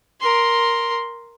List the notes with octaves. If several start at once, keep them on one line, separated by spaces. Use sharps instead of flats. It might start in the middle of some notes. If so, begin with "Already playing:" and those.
A#4 C6